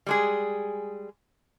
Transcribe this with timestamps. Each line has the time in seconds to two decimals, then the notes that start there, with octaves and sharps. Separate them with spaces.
0.07 G3 G#3 G#4